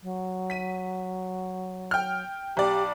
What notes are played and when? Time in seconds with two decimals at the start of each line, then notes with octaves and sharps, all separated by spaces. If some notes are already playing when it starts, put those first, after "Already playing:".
0.03 F#3
0.50 B6 D#7
1.91 G5 F6
2.57 B1 G4 D5